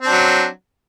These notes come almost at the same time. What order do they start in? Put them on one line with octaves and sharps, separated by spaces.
C4 D4 F#3